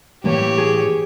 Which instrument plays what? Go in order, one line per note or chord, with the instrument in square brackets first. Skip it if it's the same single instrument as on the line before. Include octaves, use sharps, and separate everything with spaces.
[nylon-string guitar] A2 E3 A#3 [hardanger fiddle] G4 C#5
[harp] G#4